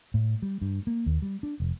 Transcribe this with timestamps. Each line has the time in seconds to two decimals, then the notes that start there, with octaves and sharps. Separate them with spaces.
0.14 A2
0.42 G3
0.62 G2
0.87 A#3
1.06 D#2
1.22 G3
1.43 D4
1.60 F1